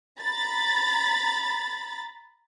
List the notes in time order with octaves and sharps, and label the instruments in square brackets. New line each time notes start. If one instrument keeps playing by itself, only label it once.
[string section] A#5 B5 A6